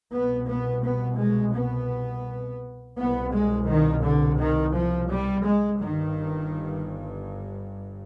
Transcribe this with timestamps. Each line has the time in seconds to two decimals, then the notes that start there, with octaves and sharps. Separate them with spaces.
0.14 C2 B2 B3
0.50 B3
0.84 B3
1.20 G#3
1.56 B3
2.98 C2 B2 B3
3.33 G#3
3.68 D#3
4.04 D3
4.39 D#3
4.75 F3
5.11 G3
5.46 G#3
5.81 G1 G2 D#3